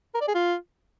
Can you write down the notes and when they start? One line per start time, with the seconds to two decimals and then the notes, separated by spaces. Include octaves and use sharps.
0.14 A#4
0.21 D5
0.28 G#4
0.35 F4